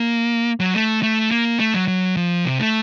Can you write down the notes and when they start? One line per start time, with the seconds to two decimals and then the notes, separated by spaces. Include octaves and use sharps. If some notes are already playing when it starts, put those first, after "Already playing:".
Already playing: A#3
0.60 F#3
0.74 A3
1.03 A3
1.31 A#3
1.60 A3
1.74 F#3
1.88 F#3
2.17 F3
2.45 C3
2.59 A3